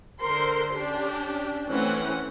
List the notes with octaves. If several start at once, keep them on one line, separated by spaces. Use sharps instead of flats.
D3 A#4 C5 C6
C#4 D4 G4
E3 A3 C4 C#4 F#5